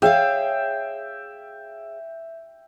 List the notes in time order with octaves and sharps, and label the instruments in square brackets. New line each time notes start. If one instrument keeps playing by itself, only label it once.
[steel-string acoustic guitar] G#4 C#5 F5 [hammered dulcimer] E5 G5